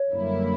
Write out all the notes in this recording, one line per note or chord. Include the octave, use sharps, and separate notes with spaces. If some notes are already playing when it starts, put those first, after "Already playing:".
Already playing: C#5
F#2 D3 G3 A#3 E4